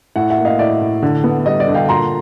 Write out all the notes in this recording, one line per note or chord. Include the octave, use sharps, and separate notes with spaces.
A2 E5 F#5
E5 F#5
A#3
D#5 F5
A2 D5 E5
A2
D3
B3
G3 D#5
D5
D3
F5 G5
A#2 A#5 C6